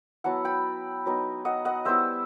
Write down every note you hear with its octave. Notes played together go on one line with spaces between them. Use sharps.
F#3 B3 E4 F#5 A5
G5 B5
F#3 B3 D#4
D#5 F#5
D#5 F#5
G3 B3 E4 C5 E5